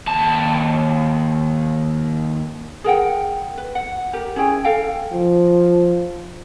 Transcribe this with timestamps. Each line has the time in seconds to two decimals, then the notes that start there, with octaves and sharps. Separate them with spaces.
0.08 D#2 A5
2.84 G#4 A#4 F#5 G5
3.58 B4
3.75 F#5
4.13 G4 A#4
4.36 C#4 E4 G#4 G5
4.64 A4 F5 G5
5.12 F3